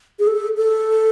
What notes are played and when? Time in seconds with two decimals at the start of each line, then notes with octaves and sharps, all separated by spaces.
0.19 G#4
0.27 A4
0.57 A4